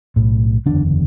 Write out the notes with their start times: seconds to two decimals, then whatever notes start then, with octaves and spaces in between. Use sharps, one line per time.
0.16 B1 A2
0.66 F#1 E2 D3 D4